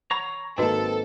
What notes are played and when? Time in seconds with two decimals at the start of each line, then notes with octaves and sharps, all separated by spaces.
0.11 C#5 F#5 A#5 B5
0.58 G#1 D#3 A#3 C4 F#4 A4 B4 D#5